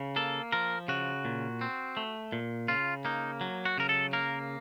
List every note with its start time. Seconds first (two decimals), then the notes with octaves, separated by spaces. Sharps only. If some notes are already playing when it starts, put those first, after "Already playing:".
Already playing: C#3
0.16 A#3 A4
0.52 F3 A#4
0.88 C#3 F#4
1.25 A#2
1.61 C4
1.97 A3
2.32 A#2
2.68 C#3 F4
3.05 A#3 D#4
3.41 F#3
3.65 F#4
3.78 C#3 A#4
3.89 A4
4.13 A#3 A#4